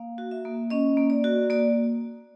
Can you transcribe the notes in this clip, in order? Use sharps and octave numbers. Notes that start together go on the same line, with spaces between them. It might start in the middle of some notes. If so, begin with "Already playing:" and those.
Already playing: A#3 F5
F#4
E5
A#3
C#4 D#5
A#3
D5
F#4
A#3 D5